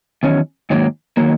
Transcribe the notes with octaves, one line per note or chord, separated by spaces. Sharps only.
E2 D#3 F#3 C#4
G#2 D#3 F#3 A#3
D#3 F#3 A#3